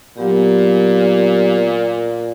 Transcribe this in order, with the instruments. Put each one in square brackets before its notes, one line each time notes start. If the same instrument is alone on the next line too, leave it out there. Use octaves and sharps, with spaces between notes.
[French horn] A#2 [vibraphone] F#3 B3 G4